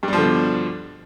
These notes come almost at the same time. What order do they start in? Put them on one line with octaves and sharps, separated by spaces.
G2 G3 F3 D3 B2